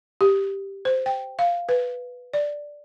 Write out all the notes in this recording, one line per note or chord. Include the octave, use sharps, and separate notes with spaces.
G4
C5
G5
F5
B4
D5